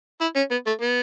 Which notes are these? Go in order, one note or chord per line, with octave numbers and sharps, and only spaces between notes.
E4
C#4
B3
A3
B3